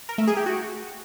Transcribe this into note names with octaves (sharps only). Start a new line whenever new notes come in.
A#4
A3
G#4
G4
F#4